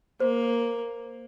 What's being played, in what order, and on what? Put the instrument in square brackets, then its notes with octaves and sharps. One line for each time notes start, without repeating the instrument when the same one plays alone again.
[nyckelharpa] A#3 [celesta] C5